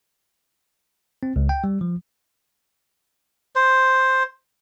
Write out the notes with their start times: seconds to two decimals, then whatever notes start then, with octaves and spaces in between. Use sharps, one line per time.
1.23 C4
1.36 C#2
1.49 G5
1.64 G3
1.81 F3
3.55 C5